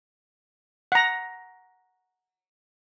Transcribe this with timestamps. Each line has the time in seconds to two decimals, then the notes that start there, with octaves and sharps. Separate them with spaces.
0.92 F#5 A#5